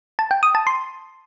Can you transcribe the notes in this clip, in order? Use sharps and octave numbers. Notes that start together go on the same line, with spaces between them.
A5
G5
D#6
A5
C6